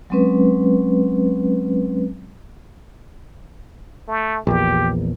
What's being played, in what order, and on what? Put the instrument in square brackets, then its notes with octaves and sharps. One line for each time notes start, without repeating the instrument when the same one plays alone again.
[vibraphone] F#3 G#3 C4 C#4 B4
[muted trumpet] A3
[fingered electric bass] A#1 E2 [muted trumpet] G4